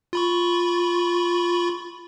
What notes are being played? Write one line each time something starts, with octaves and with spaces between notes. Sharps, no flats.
F4 B5 C#6